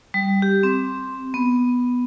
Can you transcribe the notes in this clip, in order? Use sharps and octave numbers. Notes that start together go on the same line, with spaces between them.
G3
G4
C4
B3